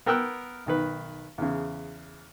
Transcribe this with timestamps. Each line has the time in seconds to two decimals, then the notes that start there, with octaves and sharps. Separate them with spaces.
0.06 B3 A#4 G5 E6 F#6
0.66 B1 D#3 B4
1.38 E2 C#3